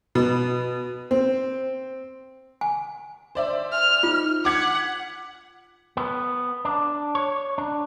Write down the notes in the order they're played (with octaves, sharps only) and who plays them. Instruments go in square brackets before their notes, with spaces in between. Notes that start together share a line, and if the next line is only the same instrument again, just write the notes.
[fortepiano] B2
C4
[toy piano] G#5
[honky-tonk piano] C5 D5 E5
[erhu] F6
[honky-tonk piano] D#4 [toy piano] F4
[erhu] F#5 [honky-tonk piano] D6 G#6 B6
[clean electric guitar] B3
D4
C#5
D4